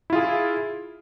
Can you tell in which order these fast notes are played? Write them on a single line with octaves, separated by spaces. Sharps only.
E4 F4 G#4